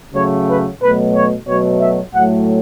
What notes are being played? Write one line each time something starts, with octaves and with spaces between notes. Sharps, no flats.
C#3 F#3 A3 C#5
B4
B2 F#3 A3 B4
C#5
B2 F#3 A3 C#5
E5
A2 F#3 A3 F#5